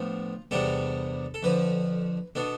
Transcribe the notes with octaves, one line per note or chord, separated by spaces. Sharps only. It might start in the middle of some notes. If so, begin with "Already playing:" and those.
Already playing: A2 F3 B3 D4 F4
E2 C3 G3 B3 D4 A4
A4
F2 D3 F3 B4
B2 B3 D4 A4